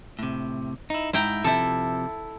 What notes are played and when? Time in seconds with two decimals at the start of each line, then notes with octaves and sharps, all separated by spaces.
0.19 A2 C3
0.90 D#4 E4
1.13 G#2 E4 G5 A#5
1.44 C3 F3 E4 A4